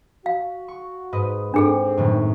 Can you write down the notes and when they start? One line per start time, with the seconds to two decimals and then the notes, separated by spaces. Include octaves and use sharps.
0.26 F#4 F5
0.68 C#6
1.12 G#2 B4 D#5
1.54 G#2 C4 D4 G#4 A4
1.97 F#2 A2 D#3